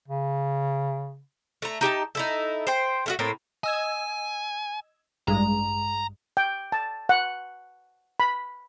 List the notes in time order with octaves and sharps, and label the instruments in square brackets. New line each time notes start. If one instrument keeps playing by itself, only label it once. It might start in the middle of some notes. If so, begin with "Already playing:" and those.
[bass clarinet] C#3
[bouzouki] A3 A#5
D#4 G4 G#5 A5
D#4 E4 A4
C5 G5
A3 F4 F#4
A2 A#3 C4
[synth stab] D#5 E6 G#6 [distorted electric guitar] G#5
[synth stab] A1 G2 G#3 [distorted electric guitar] A#5
[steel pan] G5
A5
F#5
B5